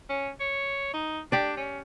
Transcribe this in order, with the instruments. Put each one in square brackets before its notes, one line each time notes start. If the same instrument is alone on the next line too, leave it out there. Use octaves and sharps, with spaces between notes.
[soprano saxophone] C#4
C#5
D#4
[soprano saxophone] D4 [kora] G4 D5
[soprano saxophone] C#4